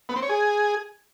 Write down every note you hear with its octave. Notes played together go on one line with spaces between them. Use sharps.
B3
C4
C#5
G#4